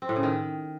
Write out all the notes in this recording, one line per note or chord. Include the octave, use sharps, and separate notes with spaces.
C4
A2
C#3
D#3